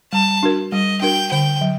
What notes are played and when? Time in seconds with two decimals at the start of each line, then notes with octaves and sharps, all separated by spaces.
0.13 G3 A5
0.43 D4 F#4 A#4
0.72 G3 D#5
1.02 D4 F#4 A#4 G5
1.32 D3 G5
1.61 F#3